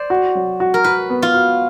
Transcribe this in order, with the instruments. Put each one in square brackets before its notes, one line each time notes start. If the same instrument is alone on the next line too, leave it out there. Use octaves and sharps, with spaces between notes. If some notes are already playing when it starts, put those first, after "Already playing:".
Already playing: [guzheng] C5 D5
[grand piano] F#4
F#3
F#4
[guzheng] A#4
[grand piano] F#4 [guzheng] B4
[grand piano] B3
[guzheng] F4
[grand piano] F#4